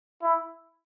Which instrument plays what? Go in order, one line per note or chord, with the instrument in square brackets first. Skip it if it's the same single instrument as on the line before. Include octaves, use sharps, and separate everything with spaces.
[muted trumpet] E4